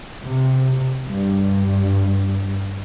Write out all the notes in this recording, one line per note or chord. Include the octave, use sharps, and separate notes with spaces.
C3
G2